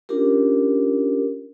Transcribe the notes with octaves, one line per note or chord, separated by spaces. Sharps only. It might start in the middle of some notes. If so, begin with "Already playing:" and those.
C#4 D4 F4 G4 A#4